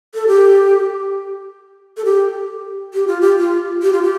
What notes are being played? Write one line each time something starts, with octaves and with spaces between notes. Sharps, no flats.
A4
G4
A4
G4
G4
F4
G4
F4
G4
F4
G4